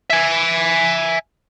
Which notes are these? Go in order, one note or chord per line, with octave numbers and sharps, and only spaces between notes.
E5 G#5